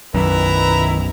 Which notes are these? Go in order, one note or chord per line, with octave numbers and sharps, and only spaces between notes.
B1 F#2 D#3 E4 B4 E5 A#5